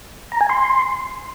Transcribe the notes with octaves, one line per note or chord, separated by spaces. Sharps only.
A#5
G#5
C6